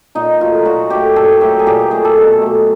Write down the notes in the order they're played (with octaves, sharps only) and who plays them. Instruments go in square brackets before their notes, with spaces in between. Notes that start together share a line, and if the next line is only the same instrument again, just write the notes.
[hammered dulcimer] A#2 D#4
F#3 A3 F4
A#2 F#4
F#3 A3 G4
A#2 A4
F#3 A3 G4
G#4
A#2 G4
F#3 A3 G#4
A4
B2
F#3 A3